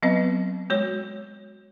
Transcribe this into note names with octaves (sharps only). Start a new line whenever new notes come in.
F#3 B3 C4 B4 D#5
G#3 F#4 C#5